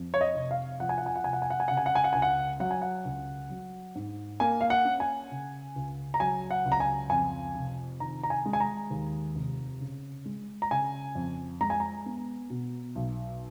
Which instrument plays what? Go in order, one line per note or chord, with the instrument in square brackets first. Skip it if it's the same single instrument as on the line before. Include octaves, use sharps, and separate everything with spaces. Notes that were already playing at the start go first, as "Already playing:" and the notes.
Already playing: [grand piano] F2
C#5
D#5
F1
F5
F3 F#5
G#5
F#5
G#5
F#5
F1 G#5
F#5
G#5
F#5
G#5
C#3 F#5
G#5
F#5
G#5
F#5
C#2 G#5
F#5
F#3 F#5
G#5
F#5
C#2
F#3
G#2
A#3 G#5
F5
F#5
C#4
G#5
C#3
C#2
A#5
F#3 G#5
F#5
C#2
A#5
G#5
F2 G#5
F1
D#3 A#5
A#5
G#5
G#3
G#5
A#5
D#2
F1
C#3
G#3
A#5
C#3 G#5
F2
G#3 A#5
G#5
A#5
B3
B2
B1